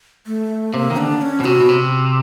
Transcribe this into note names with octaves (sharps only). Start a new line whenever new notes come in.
A3
C3 A#3
D#3
D3 D4
C#4
B2
C3 F#4
B2
C3